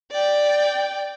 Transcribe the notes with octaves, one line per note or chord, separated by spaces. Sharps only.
D5 G5